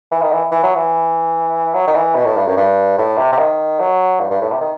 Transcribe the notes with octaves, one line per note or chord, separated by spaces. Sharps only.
E3
D#3
E3
E3
F#3
E3
F#3
D#3
E3
B2
A2
G2
F#2
G2
A2
C3
C3
D#3
F#3
G2
G2
A2
C3
D#3